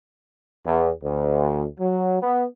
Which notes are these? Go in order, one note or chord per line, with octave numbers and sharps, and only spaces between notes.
E2
D2
F#3
B3